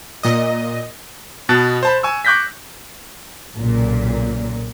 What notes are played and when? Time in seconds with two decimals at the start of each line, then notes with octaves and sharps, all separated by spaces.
0.23 A#2 D#5
1.49 B2 B3 A5 F#6 A6
1.83 C5 A5 B5
2.03 G#5 C#6 E6
2.25 C#6 D6 F#6 G6 A#6 B6
3.56 B1 A#2 C#3